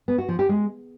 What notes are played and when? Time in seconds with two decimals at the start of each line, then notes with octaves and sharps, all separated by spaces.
0.08 B3
0.18 F#4
0.29 F3
0.39 G4
0.49 G#3